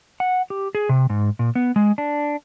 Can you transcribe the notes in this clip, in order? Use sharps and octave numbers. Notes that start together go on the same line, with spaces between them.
F#5
G4
G#4
C3
G#2
A#2
B3
G#3
D4